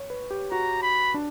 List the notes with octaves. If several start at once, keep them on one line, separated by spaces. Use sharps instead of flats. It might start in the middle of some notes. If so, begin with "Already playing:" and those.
Already playing: C#5
B4
G4
F#4 A#5
B5
D4